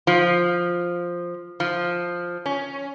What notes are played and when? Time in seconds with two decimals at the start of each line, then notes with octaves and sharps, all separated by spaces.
0.07 F3
1.60 F3
2.46 C#4